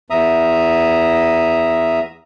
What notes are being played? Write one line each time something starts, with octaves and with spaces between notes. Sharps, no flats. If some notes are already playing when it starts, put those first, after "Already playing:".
E2 E5 A#5 D#6